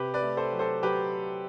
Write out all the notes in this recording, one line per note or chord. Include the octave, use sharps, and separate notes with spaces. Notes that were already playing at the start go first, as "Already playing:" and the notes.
Already playing: C3 G4 B4
B4 D5
A3
A4 C5
F#3
A4 C5
F#3 G4 B4